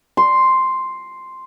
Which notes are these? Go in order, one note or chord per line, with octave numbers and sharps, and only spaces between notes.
C6